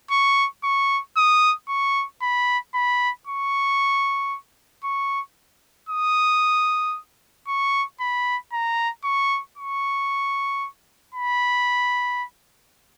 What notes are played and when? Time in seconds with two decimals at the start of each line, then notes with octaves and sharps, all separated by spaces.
0.11 C#6
0.64 C#6
1.17 D#6
1.69 C#6
2.22 B5
2.74 B5
3.27 C#6
4.84 C#6
5.89 D#6
7.48 C#6
8.00 B5
8.53 A#5
9.04 C#6
9.58 C#6
11.15 B5